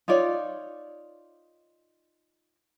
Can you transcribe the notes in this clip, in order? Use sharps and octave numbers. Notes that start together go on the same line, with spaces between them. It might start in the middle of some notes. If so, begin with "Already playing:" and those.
D#4 F4 C#5 D5